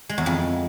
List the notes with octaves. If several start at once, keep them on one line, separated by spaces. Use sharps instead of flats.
G#3
E2
F2